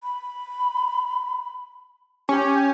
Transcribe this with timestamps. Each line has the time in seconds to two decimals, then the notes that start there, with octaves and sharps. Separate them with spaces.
0.03 B5
2.29 C#4 G4